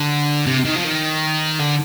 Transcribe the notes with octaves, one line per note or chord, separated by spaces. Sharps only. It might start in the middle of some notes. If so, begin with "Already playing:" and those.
Already playing: D3
C3
D#3
F3
D#3
D3